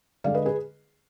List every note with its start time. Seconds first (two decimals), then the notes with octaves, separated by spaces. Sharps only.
0.24 D3 G#3 D5 F5
0.34 B4 D#5
0.45 G#4 B4